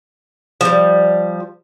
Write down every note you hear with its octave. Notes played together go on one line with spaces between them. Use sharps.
F3 G3